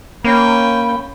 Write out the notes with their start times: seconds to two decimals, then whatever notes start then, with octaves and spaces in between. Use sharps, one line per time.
0.25 A#3 C#4 G5 B5